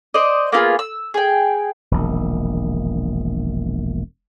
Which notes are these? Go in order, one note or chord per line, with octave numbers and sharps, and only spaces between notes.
C5 D5 D#5
A#3 B3 F4 G#4
E6
G#4 G5
E1 A#1 D#3